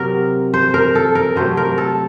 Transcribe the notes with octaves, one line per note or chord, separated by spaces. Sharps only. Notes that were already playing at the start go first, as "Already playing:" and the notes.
Already playing: C3 F#3 C4 A#4
C5
A#4
A4
A#4
C3 F#3 A3 C5
A#4
A4